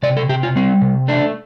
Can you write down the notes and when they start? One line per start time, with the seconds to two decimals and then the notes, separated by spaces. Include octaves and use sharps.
0.03 C3 D5
0.17 A4
0.29 C3 G4
0.43 F4
0.56 G3 C4
0.82 C3
1.08 A3 D4